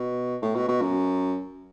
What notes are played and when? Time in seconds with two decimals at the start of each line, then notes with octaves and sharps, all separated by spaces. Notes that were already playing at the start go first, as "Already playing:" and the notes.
Already playing: B2
0.42 A2
0.55 B2
0.68 B2
0.82 F#2